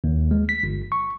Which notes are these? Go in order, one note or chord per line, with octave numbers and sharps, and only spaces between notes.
D#2
G#3
B6
G1
C#6